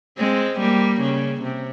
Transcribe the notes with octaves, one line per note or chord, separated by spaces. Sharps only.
G#3 C4
G3 A#3
C#3
C3